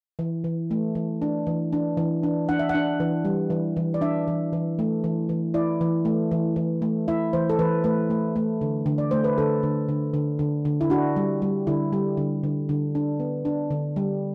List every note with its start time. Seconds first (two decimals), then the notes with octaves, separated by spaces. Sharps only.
0.19 E3
0.44 E3
0.71 A3
0.95 E3
1.22 D4
1.47 E3
1.73 D4
1.97 E3
2.23 D4
2.49 D4 F#5
2.59 E5
2.69 F#5
2.75 D4
3.00 E3
3.25 G3
3.50 E3
3.77 E3
3.94 D5
4.01 D4 E5
4.28 E3
4.53 E3
4.79 A3
5.04 E3
5.29 E3
5.54 E4 D5
5.81 E3
6.05 A3
6.31 E3
6.56 E3
6.82 A3
7.08 E4 E5
7.33 E3 C5
7.50 A4
7.59 E3 B4
7.84 A3 B4
8.10 A3
8.36 A3
8.61 D3
8.86 D3
8.98 D5
9.11 A3 C5
9.24 B4
9.38 D3 A4
9.63 D3
9.89 D3
10.14 D3
10.39 D3
10.65 D3
10.81 E4
10.90 D4 F#4
11.16 G3
11.42 G3
11.67 D3 E4
11.93 G3
12.17 D3
12.43 D3
12.69 D3
12.95 D4
13.20 B3
13.45 D4
13.71 D3
13.96 G3